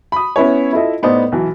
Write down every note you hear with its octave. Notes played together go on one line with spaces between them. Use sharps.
B5 D#6
B3 C#4 E4 B4 C#5
E4 F4 A4 D#5 E5
A2 B3 D#4 C5 D5 D#6
B1 E3